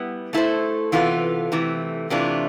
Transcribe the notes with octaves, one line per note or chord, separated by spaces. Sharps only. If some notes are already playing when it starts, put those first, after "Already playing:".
Already playing: G3 B3 E4
A3 E4 A4 C5
C3 E3 B3 F4 A4
C3 E3 A3
C3 E3 A3 D4 F4